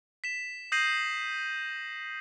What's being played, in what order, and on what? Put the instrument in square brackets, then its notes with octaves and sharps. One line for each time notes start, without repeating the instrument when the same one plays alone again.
[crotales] B6 E7
D#6 G6 A#6 C7 D#7 F#7